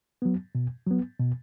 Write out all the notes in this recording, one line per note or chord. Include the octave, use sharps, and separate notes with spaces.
F#3 B3
B2
F#3 B3
B2